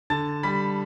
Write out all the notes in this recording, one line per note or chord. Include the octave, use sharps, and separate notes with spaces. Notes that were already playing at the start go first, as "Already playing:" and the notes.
D3 A5 A6
G3 B5 B6